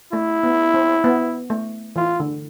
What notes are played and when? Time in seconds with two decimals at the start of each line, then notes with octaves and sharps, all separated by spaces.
0.13 A3 E4
0.43 B3
0.74 C4
1.04 B3
1.50 A3
1.96 E3 F4
2.20 D3